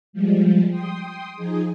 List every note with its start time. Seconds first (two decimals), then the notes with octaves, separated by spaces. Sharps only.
0.13 F3 G3 G#3
0.69 G5 C6 D#6
1.36 F3 D#4 G#4